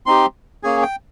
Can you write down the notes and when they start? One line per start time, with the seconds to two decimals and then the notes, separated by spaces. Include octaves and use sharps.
0.06 C4 D#4 G4 C6
0.63 A#3 C#4 G#4 G#5
0.82 G5